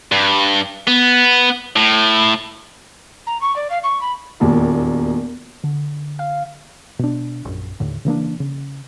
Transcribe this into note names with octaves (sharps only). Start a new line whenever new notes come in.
G2
B3
A2
A#5
C#6
D5
F5
C#6
B5
E1 D#2 A#2
D3
F5
B2 D4
A#1 F#2
D#2 A2 D3
C#3 E3 A#3 D4
C#3